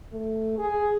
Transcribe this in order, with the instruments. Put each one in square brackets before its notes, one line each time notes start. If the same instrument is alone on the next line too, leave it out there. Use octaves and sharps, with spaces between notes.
[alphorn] A3
G#4